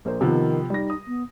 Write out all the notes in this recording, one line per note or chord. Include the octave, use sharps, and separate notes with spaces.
A#1 A#4 C5
C3 D#3 F3 B3
G3 D#4 A#6
D#6
B3